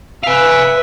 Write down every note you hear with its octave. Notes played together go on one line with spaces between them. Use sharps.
B4 E5 F5 G#5